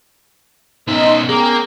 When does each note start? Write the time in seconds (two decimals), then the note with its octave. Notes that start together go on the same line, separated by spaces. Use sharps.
0.87 B2 B3 C#4 D#4 E5 C6
1.29 A#3 G#4 G5 A#5